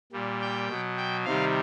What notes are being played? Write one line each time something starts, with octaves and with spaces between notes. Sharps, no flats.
A#2 G3
G5
B2 F#3
G5
C3 D#3 G3 F5